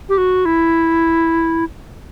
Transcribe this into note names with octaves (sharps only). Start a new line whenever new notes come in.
G4
F#4
E4